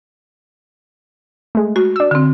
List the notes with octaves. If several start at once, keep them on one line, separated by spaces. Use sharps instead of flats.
G#3 A3
F#4
D4 E6
D3 C4